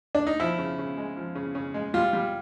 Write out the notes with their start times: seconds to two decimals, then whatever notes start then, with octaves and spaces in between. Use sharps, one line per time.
0.15 D4
0.27 D#4
0.40 F3 E4
0.58 C#3
0.78 C#3
0.98 G#3
1.17 F3
1.35 C#3
1.55 C#3
1.74 G#3
1.94 G3 F4
2.13 G3